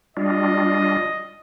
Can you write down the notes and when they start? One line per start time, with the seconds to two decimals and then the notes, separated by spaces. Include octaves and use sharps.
0.17 G3 D4 F4 D#5